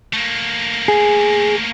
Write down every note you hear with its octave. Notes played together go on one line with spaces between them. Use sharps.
A3 A#3
G#4